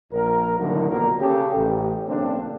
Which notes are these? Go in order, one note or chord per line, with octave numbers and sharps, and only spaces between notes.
A#1 A#4
C2 F#2 A2 D3 D#3 F#3
A#1 B2 A#3 A#4
C#3 G4 A4
A1
B1 C#3 A#3 C4 D4